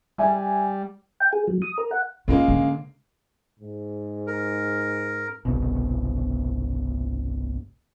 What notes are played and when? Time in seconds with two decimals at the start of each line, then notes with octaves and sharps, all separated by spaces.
0.18 G3 E5 G#5
1.20 G5
1.33 G#4
1.48 F#3
1.62 D#6
1.78 A#4
1.91 F#5
2.28 C#3 G#3 A#3 F4
2.48 D3
3.60 G#2
4.27 A#4
5.45 G1 C2 B2